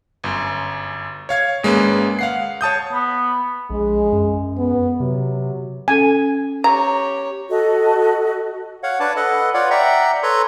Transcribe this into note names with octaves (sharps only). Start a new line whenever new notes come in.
G1 F#2
C#5 F5 G#6
G#1 G#3 A#3 C#4 B4
F5 F#5 C7
C#5 A5 D#6 G6
B3
A#1 G#3
F#2
B3
C3 F#3
C#4 A4 G#5
G4 C#5 A#5
F#4 A4 D#5
C#5 F5 F#5
D4 B4 C#5 A5 D6
A4 B4 D#5 F#5
F4 B4 C#5 D5 F5 F#5
D5 E5 F#5 G5 A#5
A4 B4 C#5 A#5 C6